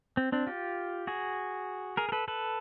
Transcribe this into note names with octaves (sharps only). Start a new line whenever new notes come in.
C4
C4 D4
F4 G4
F#4 G#4
G#4 A#4
A#4
A4 B4
A4 B4